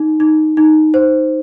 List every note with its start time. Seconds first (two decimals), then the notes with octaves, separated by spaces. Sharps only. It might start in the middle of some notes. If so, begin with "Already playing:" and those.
Already playing: D#4
0.20 D#4
0.57 D#4
0.94 C5